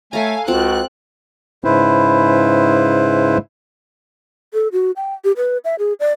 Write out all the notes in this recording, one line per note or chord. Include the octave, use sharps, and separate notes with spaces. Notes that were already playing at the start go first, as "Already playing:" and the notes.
A3 A4 C#5 F5 G#5 A#5
C#2 C4 F4 F#4 F#5 F#6
G#2 C#3 E4 B4 C5
A4
F#4
G5
G4
B4
E5
G#4
D5